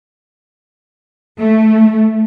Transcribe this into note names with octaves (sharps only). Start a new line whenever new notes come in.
A3